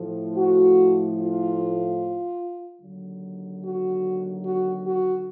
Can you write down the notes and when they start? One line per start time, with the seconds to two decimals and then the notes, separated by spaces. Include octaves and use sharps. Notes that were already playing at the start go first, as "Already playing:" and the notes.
Already playing: A2 F3
0.36 F#4
1.18 F4
2.81 D#2 D3 F#3
3.63 F#4
4.44 F#4
4.84 F#4